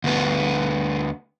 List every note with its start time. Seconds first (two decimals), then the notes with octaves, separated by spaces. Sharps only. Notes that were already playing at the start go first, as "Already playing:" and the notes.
0.04 D2 B3